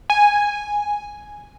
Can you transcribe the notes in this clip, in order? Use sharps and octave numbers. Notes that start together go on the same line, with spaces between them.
G#5